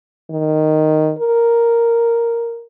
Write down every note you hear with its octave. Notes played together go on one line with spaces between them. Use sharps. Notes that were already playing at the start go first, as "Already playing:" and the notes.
D#3
A#4